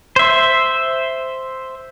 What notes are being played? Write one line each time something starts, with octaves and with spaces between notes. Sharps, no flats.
C5 E5